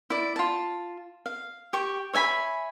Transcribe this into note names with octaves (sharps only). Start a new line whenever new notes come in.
E4 D5
F4 A5
F5
G4 C#6
C#5 E5 G#5 B5